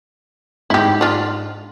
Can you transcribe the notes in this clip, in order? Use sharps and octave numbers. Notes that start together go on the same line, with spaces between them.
G#2 E4 G4
D4 F4